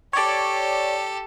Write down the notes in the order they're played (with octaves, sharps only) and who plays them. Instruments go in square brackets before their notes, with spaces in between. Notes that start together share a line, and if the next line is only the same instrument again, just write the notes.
[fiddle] G4 A4 [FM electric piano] C#5 D5